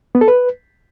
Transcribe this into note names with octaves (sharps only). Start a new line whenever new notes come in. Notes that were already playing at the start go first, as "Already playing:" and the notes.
B3
A4
B4